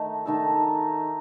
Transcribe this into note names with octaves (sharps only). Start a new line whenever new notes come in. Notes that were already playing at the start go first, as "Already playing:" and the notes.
Already playing: D#3 A3 D#4
D#3 A3 D#4 A4